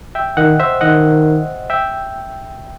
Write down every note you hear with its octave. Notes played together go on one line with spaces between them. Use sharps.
E5 G5
D#3 D#5 F#5
C5 E5
D#3 D#5 F#5
E5 G5